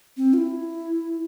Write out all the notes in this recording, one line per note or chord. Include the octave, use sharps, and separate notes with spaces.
C4
F4
E4